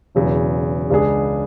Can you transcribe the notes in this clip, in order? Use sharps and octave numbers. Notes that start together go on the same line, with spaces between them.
E1 E2 C#3 F#3
C#2 C#3 G#3 D4 G#4